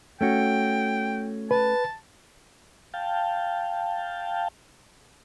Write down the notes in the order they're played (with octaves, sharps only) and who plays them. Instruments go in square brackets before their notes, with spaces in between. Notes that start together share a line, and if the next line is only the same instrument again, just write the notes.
[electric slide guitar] A3 C#4 F#4 [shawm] G5
[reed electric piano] B4 [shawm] A5
[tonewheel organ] F5 G5 A5